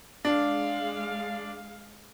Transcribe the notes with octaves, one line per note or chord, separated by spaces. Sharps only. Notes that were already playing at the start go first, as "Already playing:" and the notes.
G#3 D4 F5